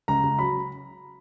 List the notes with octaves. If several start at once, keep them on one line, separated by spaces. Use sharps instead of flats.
C#2 A#5
C#2
F#3 B5